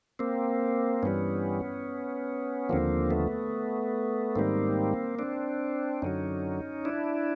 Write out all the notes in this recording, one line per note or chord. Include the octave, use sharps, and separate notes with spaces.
A#3 C4
G2 E3 G3 B3 C#4
D#2 D3 F3 A#3 C4
A3 B3
G#2 D#3 G3 A#3 C4
C4 D4
F#2 D3 F#3 C#4 D#4
D4 E4